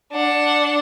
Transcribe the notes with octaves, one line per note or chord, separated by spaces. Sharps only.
D4 F#5